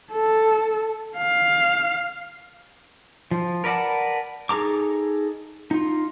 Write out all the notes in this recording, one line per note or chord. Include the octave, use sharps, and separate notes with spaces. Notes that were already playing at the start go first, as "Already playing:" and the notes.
A4
F5
F3
A#4 B4 D5 F#5 A5
D#4 G#4 A4 A#5 D6
D#4 F4